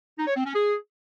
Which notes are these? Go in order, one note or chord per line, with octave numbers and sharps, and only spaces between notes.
D#4
C#5
C4
C#4
G#4